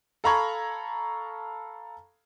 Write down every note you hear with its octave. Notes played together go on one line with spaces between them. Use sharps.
A4 F5 A#5 B5 C#6 G#6